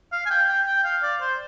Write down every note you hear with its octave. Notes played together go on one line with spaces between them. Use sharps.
F5
G#5
G5
G5
G5
F5
D5
C5